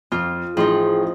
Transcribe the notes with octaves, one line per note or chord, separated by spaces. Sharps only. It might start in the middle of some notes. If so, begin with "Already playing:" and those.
F2 F4
A1 F3 D#4 G#4 C6